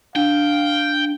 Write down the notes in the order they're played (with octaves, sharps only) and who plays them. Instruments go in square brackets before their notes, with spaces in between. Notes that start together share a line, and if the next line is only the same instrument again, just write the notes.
[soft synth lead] D4 [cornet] F5 [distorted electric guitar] G5